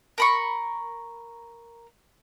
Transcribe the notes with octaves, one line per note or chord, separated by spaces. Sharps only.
A#4 B5 C#6